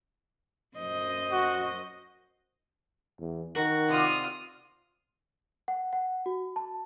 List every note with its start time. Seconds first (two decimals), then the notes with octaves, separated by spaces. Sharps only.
0.78 F#2 C5 D#5
1.31 F#4
3.19 E2
3.56 D#3 F#4 A#4
3.89 C3 C4 F4 D5 D#6
5.68 F#5
5.93 F#5
6.26 F#4
6.56 A5